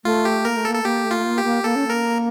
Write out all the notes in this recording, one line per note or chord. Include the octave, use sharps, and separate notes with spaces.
A3 F4
G4
A#3 A#4
A3
A4
A#3
A4
A#3 G4
A3
F4
A#3
G4
A#3
A#3 A4
C#4
A#3 A#4